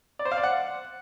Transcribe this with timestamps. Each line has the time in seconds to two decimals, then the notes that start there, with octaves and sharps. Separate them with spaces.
0.19 D5
0.25 C5
0.31 F5
0.37 D5
0.43 F#5